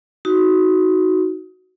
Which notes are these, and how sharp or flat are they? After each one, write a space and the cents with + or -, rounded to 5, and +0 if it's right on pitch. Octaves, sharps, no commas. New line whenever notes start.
D#4 +20 F#4 +0